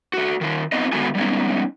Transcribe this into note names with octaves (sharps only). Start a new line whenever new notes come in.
A3 F#4
D#3 F4
B3 C4 D#4 F4 D#5
D3 D#3 G#3 B3 F#4 G#5
G3 G#3 B3 C#4 D#4